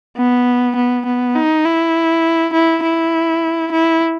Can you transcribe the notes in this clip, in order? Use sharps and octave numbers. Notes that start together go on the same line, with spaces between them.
B3
B3
B3
D#4
E4
E4
E4
E4